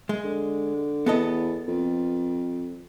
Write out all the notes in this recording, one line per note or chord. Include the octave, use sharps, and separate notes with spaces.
G#3
D3
E2 B3 A4 D#5
F2